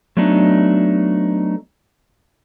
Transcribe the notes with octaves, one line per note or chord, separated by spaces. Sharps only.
F#3 A3 B3 D4 D#4